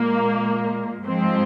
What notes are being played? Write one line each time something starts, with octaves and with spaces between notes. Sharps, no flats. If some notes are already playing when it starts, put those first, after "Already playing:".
Already playing: A#2 G#3 A#3
G#2 F3 G#3 C4